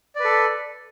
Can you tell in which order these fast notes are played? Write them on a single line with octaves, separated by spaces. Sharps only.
D5 B4 A4